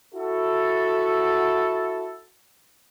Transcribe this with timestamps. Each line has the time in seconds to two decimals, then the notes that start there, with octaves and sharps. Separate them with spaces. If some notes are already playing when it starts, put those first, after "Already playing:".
0.14 E4 F#4 A4